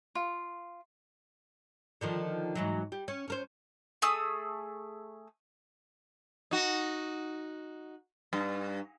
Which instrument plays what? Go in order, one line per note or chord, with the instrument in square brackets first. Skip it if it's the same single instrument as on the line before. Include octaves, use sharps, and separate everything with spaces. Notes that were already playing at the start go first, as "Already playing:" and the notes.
[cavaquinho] F4
[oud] D3 D#3 F3
G#2 E3 F#3
G3
C#4
C#4 A#4 C5
[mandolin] A3 G#4 D#6 E6
[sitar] D#4 F#4
G2